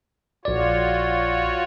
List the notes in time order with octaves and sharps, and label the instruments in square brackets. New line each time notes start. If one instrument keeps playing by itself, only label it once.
[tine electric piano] A#1 D5 [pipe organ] F4 F#4 C#5